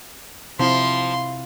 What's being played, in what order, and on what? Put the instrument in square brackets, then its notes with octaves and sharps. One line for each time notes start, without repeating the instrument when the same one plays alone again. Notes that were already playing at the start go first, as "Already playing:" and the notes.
[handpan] C3 C4 E4 [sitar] F3 [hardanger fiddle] C6